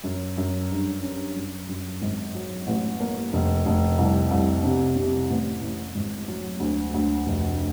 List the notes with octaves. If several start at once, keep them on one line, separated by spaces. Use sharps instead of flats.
F#2
F#2
G2
C#4
F#2
F#2
G#1
F#3
A1
A#3
F1
F1
C2
C2
C3
C3
A1
A1
G#1
F#3
D2
D2
F1